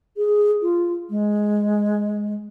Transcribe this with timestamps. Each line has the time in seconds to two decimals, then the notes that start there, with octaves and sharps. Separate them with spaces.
0.17 G#4
0.62 F4
1.10 G#3